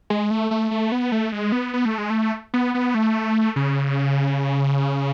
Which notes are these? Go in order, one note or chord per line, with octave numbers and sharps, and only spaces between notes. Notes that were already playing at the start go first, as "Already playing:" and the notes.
G#3
A3
A3
A3
B3
A3
G#3
B3
B3
A3
G#3
A3
B3
B3
A3
C#3